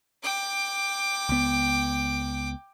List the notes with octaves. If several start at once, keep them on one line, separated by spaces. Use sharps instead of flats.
G5 D6
C#2 B3